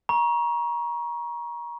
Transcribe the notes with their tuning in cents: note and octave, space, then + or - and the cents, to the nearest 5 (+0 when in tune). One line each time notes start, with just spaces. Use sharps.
A#5 +30 C#6 +0